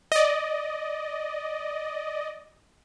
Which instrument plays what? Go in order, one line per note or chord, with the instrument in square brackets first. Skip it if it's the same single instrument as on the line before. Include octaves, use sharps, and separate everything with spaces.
[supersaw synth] D5 D#5